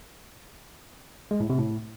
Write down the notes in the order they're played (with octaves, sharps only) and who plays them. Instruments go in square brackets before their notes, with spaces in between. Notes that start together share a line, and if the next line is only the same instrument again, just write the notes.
[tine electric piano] G#3
A2
C3
A2